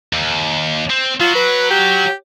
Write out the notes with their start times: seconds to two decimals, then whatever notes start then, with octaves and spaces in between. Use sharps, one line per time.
0.13 D#2
0.90 C4
1.20 F#3 F4
1.35 B4
1.70 G4